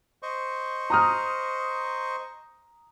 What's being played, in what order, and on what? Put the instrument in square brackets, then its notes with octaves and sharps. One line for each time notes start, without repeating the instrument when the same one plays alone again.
[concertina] C5 D#5 C#6
[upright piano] A#5 D#6 F6